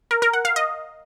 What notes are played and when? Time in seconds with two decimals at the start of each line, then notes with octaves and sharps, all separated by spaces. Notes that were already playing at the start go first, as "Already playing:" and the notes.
0.11 A#4
0.22 A#4
0.33 F#5
0.45 F5
0.56 D#5